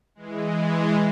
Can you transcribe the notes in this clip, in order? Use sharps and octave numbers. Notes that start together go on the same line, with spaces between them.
E3 G#3